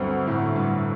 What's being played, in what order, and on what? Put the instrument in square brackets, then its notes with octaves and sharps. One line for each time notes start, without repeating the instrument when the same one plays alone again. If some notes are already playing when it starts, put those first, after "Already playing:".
Already playing: [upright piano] D2 D3 F#3 C4 [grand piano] G2
[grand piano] A2
G2